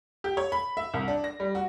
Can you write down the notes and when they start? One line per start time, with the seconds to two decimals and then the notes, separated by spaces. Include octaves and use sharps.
0.24 G4
0.37 C#5
0.52 B5
0.77 E5
0.94 C2
1.08 D4
1.24 A#6
1.40 G3
1.55 F#4